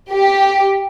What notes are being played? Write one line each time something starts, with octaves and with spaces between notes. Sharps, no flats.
G4